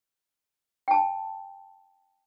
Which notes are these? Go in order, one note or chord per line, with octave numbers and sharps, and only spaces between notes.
G5 A5